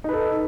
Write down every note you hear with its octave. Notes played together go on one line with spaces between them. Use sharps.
D#4 A4 B4